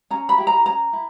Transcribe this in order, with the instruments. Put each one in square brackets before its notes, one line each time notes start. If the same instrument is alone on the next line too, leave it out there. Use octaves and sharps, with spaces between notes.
[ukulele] C#4 A#5
B5
E4 G4
A#5
C#4 A#5
E4